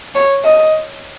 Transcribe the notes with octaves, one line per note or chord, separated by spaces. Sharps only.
C#5
D#5